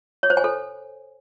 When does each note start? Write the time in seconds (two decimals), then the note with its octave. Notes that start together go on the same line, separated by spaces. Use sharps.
0.23 C#5
0.30 C5
0.37 G#5
0.44 A4